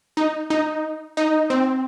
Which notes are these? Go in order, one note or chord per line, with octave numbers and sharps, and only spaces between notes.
D#4
D#4
D#4
C4